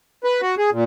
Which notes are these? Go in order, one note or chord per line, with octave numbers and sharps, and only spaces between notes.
B4
F#4
G#4
A#2